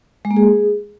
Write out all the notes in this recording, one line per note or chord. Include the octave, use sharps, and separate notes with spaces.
G#3
A#3
G#4